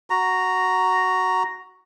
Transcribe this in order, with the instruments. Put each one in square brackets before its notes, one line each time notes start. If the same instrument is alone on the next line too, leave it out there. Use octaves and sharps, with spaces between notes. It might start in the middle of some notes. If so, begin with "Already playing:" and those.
[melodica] F#4 A#5